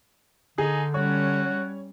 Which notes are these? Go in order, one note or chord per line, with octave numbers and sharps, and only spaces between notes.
D3 D#4 G#4
G3 C#4 F#4 C#5